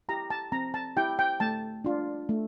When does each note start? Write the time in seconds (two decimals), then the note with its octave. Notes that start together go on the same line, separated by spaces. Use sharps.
0.09 E4 G4 A#5
0.30 A5
0.52 C4 A#5
0.74 A5
0.96 E4 G4 G5
1.19 G5
1.40 A3 A5
1.84 D4 F4
2.29 A3